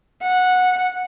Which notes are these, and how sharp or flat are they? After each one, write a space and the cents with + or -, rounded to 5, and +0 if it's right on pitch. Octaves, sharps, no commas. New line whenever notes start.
F#5 -15